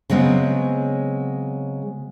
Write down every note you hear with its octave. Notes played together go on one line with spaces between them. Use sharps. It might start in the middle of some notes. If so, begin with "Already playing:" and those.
C#3 F#3 G#3 B3 C4